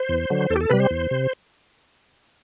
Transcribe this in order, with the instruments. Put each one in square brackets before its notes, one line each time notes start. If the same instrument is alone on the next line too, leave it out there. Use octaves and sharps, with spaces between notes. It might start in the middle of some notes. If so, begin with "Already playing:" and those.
Already playing: [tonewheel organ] C5
E2
D3 F#3
E2 A4
G4
A4
C3 G3 B4
C5
E2
C3